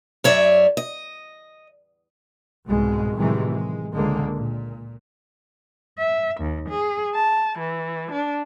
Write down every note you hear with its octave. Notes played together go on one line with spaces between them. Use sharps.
F#2 C#5 D5 E5
D#5
C2 G#2 B2 G#3
A2 C3 D#3 E3 F#3 G#3
G#3
C#2 D3 G#3 A#3
A#2
E5
D#2
G#4
A5
E3
D4